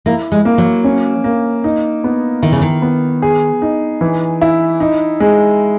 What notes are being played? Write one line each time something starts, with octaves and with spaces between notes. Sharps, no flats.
A#3 E4
G#3
A#3
F#3
C#4
A#3
D#4
B3
D#3 E4
C#3
D#3
B3
G#4
D#4
E3
E4
D#4
G#3